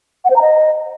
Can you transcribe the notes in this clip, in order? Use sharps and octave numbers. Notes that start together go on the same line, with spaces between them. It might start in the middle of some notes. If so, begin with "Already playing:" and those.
F#5
C5
A#5
D#5